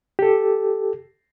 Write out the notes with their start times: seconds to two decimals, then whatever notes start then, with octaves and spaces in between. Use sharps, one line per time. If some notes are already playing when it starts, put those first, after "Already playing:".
0.19 G4 A4